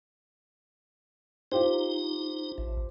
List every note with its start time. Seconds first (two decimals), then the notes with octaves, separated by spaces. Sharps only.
1.52 D#4 F4 G4 C5
2.58 A1